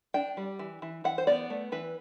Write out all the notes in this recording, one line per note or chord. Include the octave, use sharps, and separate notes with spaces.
D4 G5
G3
E3
E3
E3 F#5
C5
B3 D5
A3
E3 B4